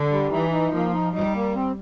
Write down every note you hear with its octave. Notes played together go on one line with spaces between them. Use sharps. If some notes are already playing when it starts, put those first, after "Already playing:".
Already playing: D3
G3
E3 D#4
D#4
F3 A#3
D#4
G3 D#4
A#3
C4